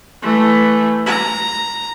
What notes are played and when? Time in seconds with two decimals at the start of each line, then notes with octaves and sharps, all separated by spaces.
0.22 E3 A3
1.06 A#5